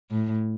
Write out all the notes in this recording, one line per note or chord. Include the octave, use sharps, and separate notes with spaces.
A2